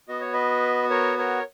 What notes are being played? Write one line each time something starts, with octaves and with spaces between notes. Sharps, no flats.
B3 F#4 D#5
C#5
B4 D#5
A#4 C#5
A#4 C#5